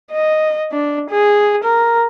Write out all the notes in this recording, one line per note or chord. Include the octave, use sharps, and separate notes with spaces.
D#5
D4
G#4
A#4